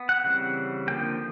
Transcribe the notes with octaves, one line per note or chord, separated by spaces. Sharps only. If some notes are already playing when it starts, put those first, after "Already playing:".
Already playing: B3
F#5
C#3 E3 G3 C4
D3 F3 A#3 G5